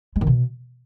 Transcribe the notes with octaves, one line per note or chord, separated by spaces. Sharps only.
G#3
D#3
B2